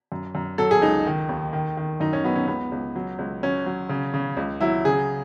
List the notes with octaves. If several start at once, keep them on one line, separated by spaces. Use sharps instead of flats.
F#2
F#2
F#3 A4
G#4
C#2 D#4
D#3
D#2
D#3
D#3
F#2 D#4
C#4
F#3 B3
C#4
C#2 B3
C#2
F#3
C#2
F#3 C#4
F#3
C#3
C#3
C#2
F#3 E4
C#3 G#4